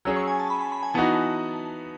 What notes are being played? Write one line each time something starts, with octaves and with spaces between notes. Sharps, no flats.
F#3 C#4 G#4 E6
C#6
G#5
A5
B5
B5
B5
G#5
E3 B3 D#4 F#4 A5